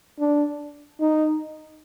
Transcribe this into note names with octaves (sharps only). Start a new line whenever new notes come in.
D4
D#4